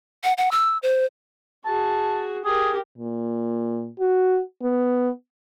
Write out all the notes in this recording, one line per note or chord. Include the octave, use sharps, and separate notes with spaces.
F#5
F#5
E6
C5
F#4 G#4 A5
G4 G#4 A#4
A#2
F#4
B3